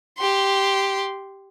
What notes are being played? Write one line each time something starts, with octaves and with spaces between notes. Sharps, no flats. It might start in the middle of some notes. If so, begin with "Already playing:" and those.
G4 C6